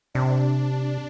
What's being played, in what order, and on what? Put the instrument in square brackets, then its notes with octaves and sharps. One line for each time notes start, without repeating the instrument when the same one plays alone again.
[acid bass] C3 [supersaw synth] D4